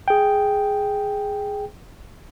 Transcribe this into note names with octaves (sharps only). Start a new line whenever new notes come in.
G#4 G5